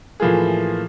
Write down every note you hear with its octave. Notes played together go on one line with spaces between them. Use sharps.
A2 E3 F3 A#3 F4 G#4